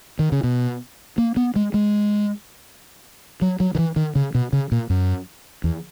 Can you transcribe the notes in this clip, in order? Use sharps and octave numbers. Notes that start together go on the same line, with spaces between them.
D#3
C#3
B2
A#3
B3
G#3
G#3
F#3
F#3
D#3
E3
D#3
C#3
B2
C#3
A#2
F#2
E2